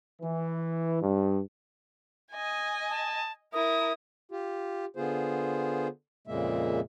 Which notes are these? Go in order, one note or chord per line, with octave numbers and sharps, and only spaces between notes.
E3
G2
D#5 G#5
A5
E4 A#4 D#6
F4 G4
D3 B3 F4 G#4 C5
F2 A#2 C#3 G#3 A#3 E5